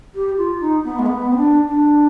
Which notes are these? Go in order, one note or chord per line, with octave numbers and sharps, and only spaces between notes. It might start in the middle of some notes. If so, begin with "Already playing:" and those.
G4
F4
D#4
B3
G#3
B3
C4
D4
D4